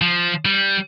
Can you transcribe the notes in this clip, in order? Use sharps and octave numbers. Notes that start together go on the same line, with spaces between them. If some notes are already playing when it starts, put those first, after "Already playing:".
F3
G3